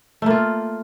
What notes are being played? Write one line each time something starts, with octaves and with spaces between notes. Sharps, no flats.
A3 A#3 F4